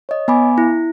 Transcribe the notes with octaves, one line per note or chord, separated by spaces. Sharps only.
C#5 D#5
B3 G#5 B5 D6
E4